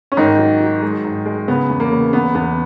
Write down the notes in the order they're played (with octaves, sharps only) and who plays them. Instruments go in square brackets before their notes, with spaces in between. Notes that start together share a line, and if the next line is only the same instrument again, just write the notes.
[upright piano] C#4
G#2 D#3 D#4
F#3
F#3
G#3
G#2
G#3
C#3 B3
E2
A#3
C#3
E2 B3
E2 B3